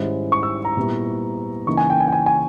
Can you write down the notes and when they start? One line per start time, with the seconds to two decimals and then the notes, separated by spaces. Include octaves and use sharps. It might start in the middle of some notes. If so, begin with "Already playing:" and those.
Already playing: G#2 D#3 G3 C#4 E4
0.32 C#6
0.43 E6
0.65 A#5
0.77 A#2 G3 B3 E4
1.67 C#3 E3 A#3 D#4 C#6
1.77 G#5
1.90 G5
2.00 G#5
2.07 G5
2.12 G#5
2.26 G#5